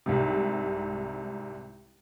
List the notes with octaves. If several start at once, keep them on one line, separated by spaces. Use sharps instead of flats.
C2 G#2 C3